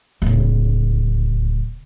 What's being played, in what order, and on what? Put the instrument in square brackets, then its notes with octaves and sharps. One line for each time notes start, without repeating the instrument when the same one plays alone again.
[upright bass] D1 C#2